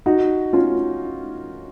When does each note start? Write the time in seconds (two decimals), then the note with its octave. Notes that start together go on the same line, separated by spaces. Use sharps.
0.06 D#4 F#4
0.53 C#4 F4